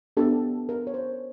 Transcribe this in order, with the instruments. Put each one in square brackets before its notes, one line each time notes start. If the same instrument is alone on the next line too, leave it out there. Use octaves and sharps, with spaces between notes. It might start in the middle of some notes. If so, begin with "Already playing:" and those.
[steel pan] B3 D4 G4 A4
A#4
C#5
C5